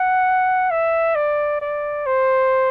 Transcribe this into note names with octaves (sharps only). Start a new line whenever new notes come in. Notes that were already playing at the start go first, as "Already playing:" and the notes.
Already playing: F#5
E5
D5
D5
C5